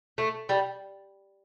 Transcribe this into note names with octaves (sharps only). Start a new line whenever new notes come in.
A3
G3